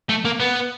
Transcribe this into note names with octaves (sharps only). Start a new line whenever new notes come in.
A3
A#3
B3